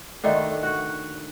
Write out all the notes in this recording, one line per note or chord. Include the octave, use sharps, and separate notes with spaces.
D3 D#3 A3 F#4
F#4 F#5